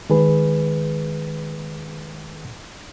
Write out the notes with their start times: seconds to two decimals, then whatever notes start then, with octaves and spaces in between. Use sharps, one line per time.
0.10 D#3 G#3 G#4 B4